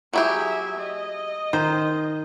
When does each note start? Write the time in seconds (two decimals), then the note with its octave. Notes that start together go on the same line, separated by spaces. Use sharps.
0.13 F#3 E4 G4 G#4 E5
0.78 D#5
1.53 D#3 C5